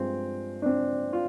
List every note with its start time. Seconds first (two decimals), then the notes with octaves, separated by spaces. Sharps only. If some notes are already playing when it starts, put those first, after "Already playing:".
Already playing: G2 F3 G#3 C4
0.62 D4
0.66 C4
1.13 F4